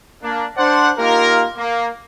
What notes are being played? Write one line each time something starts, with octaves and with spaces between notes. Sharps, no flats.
A#3 D4
D4 C5 D5 F#5
A#3 D#4 F4 G4 A#4
A#3